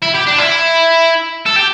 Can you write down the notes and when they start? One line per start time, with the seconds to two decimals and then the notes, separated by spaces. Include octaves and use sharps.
0.02 E4
0.14 G4
0.27 D4
0.38 E4
1.46 A4
1.56 G4